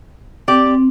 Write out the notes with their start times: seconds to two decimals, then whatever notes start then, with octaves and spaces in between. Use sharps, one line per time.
0.48 C4 G4 D5
0.66 C4